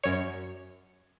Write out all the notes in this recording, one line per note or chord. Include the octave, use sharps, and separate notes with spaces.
F#2 C#5